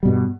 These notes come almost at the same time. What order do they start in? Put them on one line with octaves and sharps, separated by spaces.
G3 B2 G2